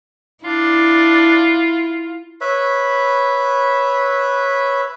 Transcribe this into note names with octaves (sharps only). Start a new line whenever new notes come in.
D4 E4 F4
B4 C#5 E5 B5